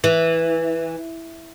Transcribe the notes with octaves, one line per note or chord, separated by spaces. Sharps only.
E3